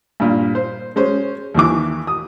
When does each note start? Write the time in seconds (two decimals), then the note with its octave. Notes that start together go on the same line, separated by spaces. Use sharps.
0.20 G2 A#2
0.55 C5
0.96 G#3 C#4 C5
1.55 D#2 D#3 E3 D6
2.07 D#6